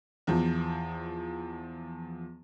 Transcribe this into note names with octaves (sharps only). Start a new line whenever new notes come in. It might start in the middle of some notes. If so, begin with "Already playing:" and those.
E2 F3